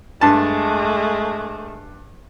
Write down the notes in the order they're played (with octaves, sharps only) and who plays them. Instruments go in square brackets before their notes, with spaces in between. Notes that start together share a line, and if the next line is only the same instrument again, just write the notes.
[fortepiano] G2 A5 [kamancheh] G#3 A3